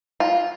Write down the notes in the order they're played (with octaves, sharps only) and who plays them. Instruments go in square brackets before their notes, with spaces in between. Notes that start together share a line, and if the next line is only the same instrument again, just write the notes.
[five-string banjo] F4